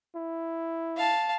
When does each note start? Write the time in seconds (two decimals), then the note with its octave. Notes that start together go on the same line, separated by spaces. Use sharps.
0.15 E4
0.97 F5 A5